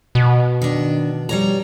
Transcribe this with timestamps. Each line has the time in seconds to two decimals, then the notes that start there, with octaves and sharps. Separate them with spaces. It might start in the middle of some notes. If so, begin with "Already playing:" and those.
0.15 B2
0.62 D#3 D4
1.29 G3 C#5 A#5